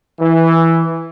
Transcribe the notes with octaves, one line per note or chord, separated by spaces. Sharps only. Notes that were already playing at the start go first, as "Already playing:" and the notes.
E3